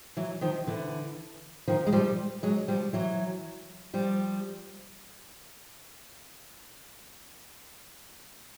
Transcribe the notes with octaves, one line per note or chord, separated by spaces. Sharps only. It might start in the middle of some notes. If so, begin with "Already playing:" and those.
E3 F#3
D#3 F3
D3 E3
D#3 F3
G#3
F3 G3
F#3 G#3
F3 G3
E3 F#3
F3 G3